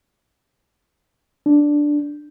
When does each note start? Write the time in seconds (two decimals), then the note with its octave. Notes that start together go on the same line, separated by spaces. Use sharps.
1.46 D4